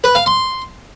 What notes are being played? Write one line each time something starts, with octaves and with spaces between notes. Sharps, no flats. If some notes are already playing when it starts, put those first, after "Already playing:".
B4
F5
C6